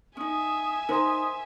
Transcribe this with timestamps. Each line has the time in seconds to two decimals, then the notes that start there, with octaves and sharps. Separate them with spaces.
0.17 C#4 D#4 E5 G#5 D#6
0.89 D#4 A#4 C5 A#5 C6 D#6